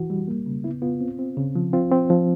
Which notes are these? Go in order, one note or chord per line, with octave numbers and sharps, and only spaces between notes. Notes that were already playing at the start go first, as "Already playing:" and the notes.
Already playing: E3 F#4
G3
A#3
C#3
B3 E4
B3 F4
C4
C4
C#3
F3
C4 F4
C4
F3